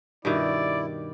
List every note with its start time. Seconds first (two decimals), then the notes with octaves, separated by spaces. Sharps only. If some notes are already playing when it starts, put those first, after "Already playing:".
0.25 G2 B2 D#3 E4 D5